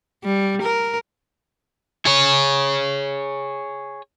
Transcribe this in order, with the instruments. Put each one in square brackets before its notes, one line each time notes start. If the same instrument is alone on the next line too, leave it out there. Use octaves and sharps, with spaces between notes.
[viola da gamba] G3
A#4
[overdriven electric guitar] G#4 C#5